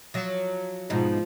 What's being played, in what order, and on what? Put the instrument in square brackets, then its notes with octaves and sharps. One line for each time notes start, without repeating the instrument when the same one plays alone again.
[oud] F3 F#3
[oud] G#2 B2 D#4 [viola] F3